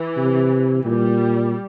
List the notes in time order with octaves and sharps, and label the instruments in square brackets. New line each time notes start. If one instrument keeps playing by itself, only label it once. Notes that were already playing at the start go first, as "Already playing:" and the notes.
Already playing: [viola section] E3
[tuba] C3
[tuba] A#2 [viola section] G3